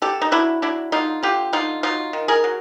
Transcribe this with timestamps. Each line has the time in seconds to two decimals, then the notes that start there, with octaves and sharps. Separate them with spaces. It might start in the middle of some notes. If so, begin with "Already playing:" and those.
0.02 D3 G4 A4
0.21 D#4
0.32 F#3 D4 E4
0.62 F#3 D4 E4
0.92 D3 D#4 F4
1.23 D3 F4 G4
1.53 D3 D#4 F4
1.83 F#3 D#4 F4
2.13 D#3
2.28 G#4 A#4
2.44 F#3